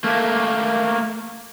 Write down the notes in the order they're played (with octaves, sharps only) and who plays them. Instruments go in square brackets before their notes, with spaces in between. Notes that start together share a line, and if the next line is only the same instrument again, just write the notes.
[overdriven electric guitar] A3 A#3